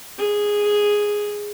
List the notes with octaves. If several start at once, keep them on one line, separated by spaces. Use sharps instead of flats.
G#4